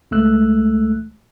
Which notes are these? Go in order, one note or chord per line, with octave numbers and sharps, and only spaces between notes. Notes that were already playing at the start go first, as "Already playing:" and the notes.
C#2 G#3 A3 E6 F#6